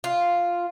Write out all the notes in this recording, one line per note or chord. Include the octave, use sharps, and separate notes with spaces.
F4